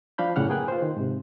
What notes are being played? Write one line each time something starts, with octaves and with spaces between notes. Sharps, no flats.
F3 D4 F5 B5 G6
F#2 A2 C#3 F#5 F6
A#3 G#4 B4 G5 G#5 F#6
F4 C5
D#3
G#2 C3